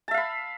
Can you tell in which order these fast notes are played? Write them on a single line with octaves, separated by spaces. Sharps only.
A5 E5 F5 B5